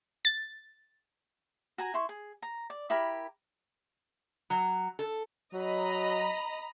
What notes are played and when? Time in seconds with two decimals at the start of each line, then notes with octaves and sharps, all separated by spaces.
0.25 A6
1.78 F#4 G#5 A#5
1.94 E4 C6 C#6
2.09 G#4
2.42 A#5
2.70 D5
2.90 E4 G4 A#4 B5
4.50 F#3
4.99 A4
5.54 F#3 D#5 A#5 B5